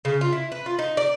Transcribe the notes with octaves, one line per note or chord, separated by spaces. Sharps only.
C#3
F4
E4
B4
F4
D#4
D5